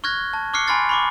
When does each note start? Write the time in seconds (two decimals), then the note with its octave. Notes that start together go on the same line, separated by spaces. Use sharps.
0.04 C#6 F6 F#6 G#6 A#6
0.33 A5
0.53 C#6 D6 F6 F#6 C7 C#7
0.67 G#5 B5 C6 F6 A6 C7
0.89 B5 C#6 D6